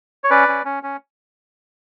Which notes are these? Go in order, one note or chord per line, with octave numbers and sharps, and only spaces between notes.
C#5
C#4 B4 D5
C#4
C#4
C#4